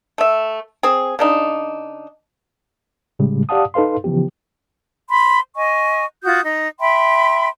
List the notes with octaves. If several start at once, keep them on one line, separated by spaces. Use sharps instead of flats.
A3 E5
C4 G#4
C#3 D4 D#4
A2 C#3 G3 G#3
G4 D5 F5 F#5 A5 D#6
D#4 A4 B4 F5 C6
C#3 E3 F3 B3 G4
B5 C6
D#5 G#5 C#6
F4 F#4 D#6 G6
D#4
E5 G5 B5 C6